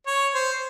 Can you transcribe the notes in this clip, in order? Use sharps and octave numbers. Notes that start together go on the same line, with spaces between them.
C#5
C5